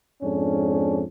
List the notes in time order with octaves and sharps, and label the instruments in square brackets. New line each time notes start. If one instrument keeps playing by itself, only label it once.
[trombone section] F2 G#2 C#4 D4